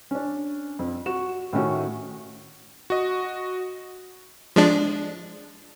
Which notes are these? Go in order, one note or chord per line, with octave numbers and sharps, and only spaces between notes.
C#4 D4
F2
F#4 E7
A2 D#3 A3 C#4 F#4
F#4 D#5
F3 G#3 D4